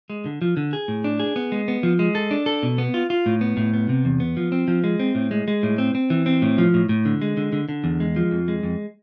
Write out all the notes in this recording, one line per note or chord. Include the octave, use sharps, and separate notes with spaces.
G#3
D3
F3
D3
G#4
A2
D4
G#4
B3
G#3
B3
F3
G#3
A4
D4
A4
B2
B3
F4
F4
A2
B3
A2
B3
C3
E2
B3
F3
C4
F3
G#3
C4
A2
G#3
G#3
A2
C4
C4
E3
C4
A2
F3
A2
A2
D3
G#3
D3
D3
D3
E2
G#3
F3
F2
G#3
F2